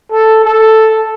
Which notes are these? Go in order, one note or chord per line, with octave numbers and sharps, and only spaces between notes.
A4
A4